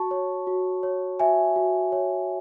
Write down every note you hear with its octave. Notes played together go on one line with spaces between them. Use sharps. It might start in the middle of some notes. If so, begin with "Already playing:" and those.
Already playing: F#4 A5 C#6
C#5
F#4
C#5
F#4 E5 G#5
F#4
C#5